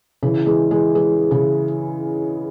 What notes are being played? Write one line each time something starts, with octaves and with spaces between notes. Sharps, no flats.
C#3 E3
E3 G#3
E3 G#3
E3 G#3
C#3 E3